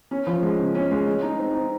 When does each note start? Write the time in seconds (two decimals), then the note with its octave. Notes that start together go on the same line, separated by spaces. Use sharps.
0.11 C#4
0.27 F3
0.42 G#3
0.59 C#3
0.75 C#4
0.91 G#3
1.07 G#3
1.22 D#4
1.39 C4
1.54 D#4